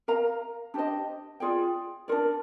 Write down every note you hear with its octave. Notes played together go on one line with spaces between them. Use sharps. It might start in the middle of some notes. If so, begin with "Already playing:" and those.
A#4 F5 A#5
D4 G4 C5 D#5
F4 G#4 D5 G5
D4 F4 A#4 D5